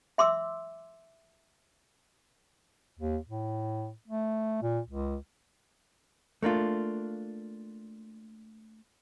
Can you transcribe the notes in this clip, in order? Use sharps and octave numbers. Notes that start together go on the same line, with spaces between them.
E5 C6 D6 E6
D#2
A2
A3
A#2
C#2
A3 A#3 D4 F4